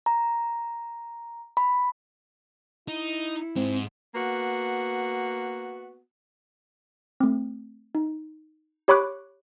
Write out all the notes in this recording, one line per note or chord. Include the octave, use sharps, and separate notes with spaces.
A#5
B5
D#4 E4
G#2 C4
A#3 B3 F#4
A3 C4
D#4
G4 C#5 B5 C#6 D6 F#6